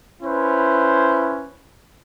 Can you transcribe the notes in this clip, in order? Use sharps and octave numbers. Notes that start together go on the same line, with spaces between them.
C#4 E4 B4 C5